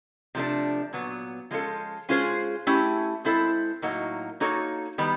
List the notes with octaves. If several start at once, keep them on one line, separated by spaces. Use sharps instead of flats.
C3 F3 A3 D4
A#2 F#3 B3
F3 G#3 C#4 F4 A4
G#3 C#4 F4 G#4 C5
A3 C#4 E4 G4
G#3 C4 E4 A4 C5
A2 F#3 A#3 D#4 F#4
A#3 D#4 F#4 A4 C#5
D#3 G3 B3